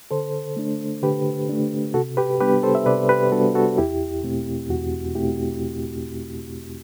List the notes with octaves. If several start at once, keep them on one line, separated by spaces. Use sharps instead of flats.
D3 A4 C5
A3 D4
D3 G4 B4
A3 D4
C3 F#4 A4
G4 B4
G3 B3 D4 G4 B4
A4 C5
E5
C3 B4 D5
G4 B4
G3 B3 D4 F#4 A4
F#4 A4
E2 E4 G4
B2 A3 C4
E2 F#4
B2 A3 C4 E4 G4